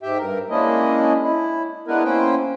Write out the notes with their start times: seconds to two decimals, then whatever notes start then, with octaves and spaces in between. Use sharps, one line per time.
0.03 G#2 G4 E5 G5
0.19 G2 A#4
0.50 G#3 A#3 C#4 D4 E4 D#5
1.22 E4
1.88 G#3 B3 D4 E4 A#4 B4
2.04 A#3 C#4 E4 C5 G5